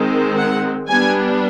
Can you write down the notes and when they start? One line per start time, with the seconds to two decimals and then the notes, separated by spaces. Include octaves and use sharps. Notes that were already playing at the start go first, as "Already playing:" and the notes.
Already playing: D#3 G#3 C4
0.37 F#5
0.88 G3 B3 D4 G#5